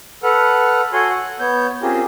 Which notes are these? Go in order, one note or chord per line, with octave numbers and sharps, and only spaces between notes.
A4 B4 F#5 F6
F#4 A4 C#5 F#5 G#5 C6
F#5
B3 C#5 G6
C4 C#4 F4 G4 G#4 A#4